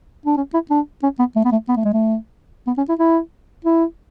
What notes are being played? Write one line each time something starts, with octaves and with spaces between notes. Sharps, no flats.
D4
C#4
E4
D4
C#4
B3
A3
B3
A3
B3
A3
G#3
A3
B3
C#4
E4
E4
E4